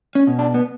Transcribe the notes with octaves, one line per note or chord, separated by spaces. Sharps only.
C#4
B2
D4
B3